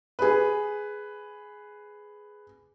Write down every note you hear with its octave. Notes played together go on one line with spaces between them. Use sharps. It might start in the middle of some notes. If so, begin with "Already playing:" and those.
G#4 B4